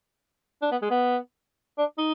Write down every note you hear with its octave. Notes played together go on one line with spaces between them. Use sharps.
D4
B3
G#3
B3
D4
D#4